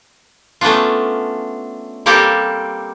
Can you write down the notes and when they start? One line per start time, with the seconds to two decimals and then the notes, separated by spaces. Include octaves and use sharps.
0.61 A3 B3 C#4 D4 F4
2.06 G3 A#3 C4 G4 A4